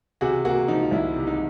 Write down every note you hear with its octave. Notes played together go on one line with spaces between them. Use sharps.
C3 F#4 G#4
A#3 F#4 G#4
F3 D#4
F4
C2 E4
C3
D#4